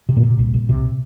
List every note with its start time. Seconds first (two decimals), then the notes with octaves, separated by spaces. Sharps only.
0.09 C3
0.16 A#2 A#3
0.23 C3
0.39 C2
0.54 C2
0.69 C3